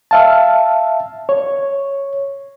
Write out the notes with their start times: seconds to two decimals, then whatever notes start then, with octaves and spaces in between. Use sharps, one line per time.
0.11 E5 F5 A5
1.29 C#5